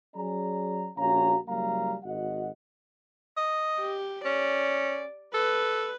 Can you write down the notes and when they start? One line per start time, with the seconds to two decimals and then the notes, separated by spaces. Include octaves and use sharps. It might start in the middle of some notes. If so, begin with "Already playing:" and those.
0.16 F#3 C#4 G#4 D5 A#5
0.97 A#1 C#4 F#4 F5 A#5
1.47 F#1 F#2 G3 A#3 F5 A#5
2.04 G#1 F#4 D#5 F#5
3.37 D#5
3.79 G4
4.25 C#4 D5
5.34 A4 B4